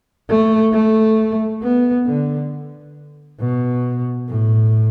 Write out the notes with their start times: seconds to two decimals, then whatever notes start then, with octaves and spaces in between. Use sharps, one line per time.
0.29 A3
0.73 A3
1.62 B3
2.06 D3
3.40 B2
4.29 A2